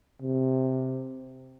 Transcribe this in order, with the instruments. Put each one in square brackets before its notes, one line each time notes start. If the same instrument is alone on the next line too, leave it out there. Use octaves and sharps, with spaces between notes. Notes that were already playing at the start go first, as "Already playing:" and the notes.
[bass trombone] C3